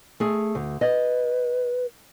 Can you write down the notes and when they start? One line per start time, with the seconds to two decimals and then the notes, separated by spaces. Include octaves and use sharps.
0.20 A3 G#4
0.55 D2
0.81 B4 D#5